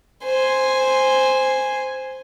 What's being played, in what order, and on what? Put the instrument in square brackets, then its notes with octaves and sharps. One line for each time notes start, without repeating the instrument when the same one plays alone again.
[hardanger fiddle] C5 G#5